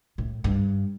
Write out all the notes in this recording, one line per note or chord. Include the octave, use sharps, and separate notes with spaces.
A2
G2